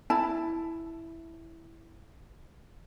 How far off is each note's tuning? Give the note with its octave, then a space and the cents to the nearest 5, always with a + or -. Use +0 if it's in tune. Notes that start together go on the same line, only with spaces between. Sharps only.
E4 +0 A5 +0